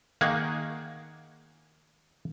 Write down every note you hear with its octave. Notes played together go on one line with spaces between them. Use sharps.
D#3 A#3 G#4 F#5 G#5